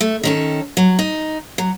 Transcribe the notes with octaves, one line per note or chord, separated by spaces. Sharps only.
A3
D#3 C#4 A4
F#3
D#4
F#3